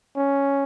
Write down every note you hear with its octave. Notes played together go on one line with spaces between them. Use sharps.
C#4